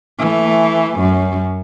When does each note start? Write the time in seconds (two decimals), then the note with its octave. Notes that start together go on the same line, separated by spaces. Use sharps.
0.19 E3 A3
0.99 F#2